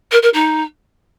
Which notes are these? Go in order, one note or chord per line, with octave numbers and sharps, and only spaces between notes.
A#4
A#4
D#4